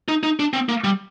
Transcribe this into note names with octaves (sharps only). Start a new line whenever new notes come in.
D#4
D#4
D4
C4
A#3
G3